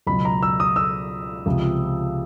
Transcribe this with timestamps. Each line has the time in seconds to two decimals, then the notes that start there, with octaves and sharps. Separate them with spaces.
0.07 C#2 B2 F#3 B5
0.25 A#5
0.42 E6
0.60 D#6
0.76 E6
1.46 C#2 C3 F3